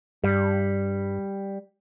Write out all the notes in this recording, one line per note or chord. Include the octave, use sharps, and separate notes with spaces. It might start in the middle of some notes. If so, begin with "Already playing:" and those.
G2 G3